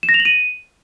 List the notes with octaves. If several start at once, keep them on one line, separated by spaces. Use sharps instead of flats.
E7
A#6
F7
F#7
D#7